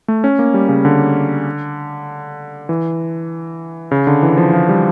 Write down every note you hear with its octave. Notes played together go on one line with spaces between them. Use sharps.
A3
C#4
A#3
G3
C#3
D3
E3
C#3
D3
E3
F3
F3
G3